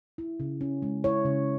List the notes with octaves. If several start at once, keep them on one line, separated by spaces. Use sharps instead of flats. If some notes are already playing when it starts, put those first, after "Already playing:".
E4
C#3
C#4
G#3
E4 C#5
C#3